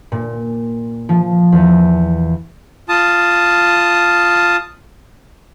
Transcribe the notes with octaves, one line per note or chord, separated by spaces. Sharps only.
A#2
F3
E2
F4 A5 D#6